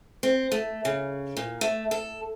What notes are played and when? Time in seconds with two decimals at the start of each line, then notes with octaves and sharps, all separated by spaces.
0.23 C4
0.52 A3
0.85 C#3
1.37 A#2
1.61 A3
1.91 A4